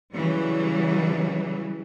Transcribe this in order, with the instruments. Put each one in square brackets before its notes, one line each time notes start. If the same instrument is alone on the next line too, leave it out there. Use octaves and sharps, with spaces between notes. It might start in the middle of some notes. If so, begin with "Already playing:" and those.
[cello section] C#3 E3 F#3 G3